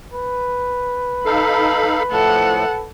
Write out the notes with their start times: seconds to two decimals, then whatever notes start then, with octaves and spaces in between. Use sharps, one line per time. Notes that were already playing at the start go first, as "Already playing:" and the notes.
0.14 B4
1.26 D#4 A4 F5 B5
2.11 A2 F3 A3 A4 F#5